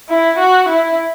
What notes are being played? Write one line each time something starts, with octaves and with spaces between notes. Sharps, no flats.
E4
F#4
E4